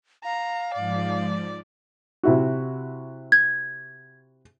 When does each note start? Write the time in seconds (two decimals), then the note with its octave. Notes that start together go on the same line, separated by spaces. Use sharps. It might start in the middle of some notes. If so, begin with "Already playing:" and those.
0.25 F5 A#5
0.74 G#2 F3 D5
2.23 C3 E4 F#4
3.32 G#6